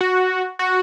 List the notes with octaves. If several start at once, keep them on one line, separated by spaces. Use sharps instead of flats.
F#4
F#4